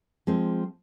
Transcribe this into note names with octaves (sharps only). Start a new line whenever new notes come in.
F3 G#3 C4